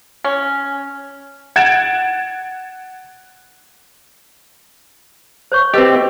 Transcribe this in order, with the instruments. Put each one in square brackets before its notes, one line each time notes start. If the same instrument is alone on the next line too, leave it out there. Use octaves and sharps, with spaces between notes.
[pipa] C#4
[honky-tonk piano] F#5 G#6 A6 D7 E7
[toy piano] C5 C#5 C#6
[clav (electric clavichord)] C4 G4 [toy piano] F#4 B4 D#5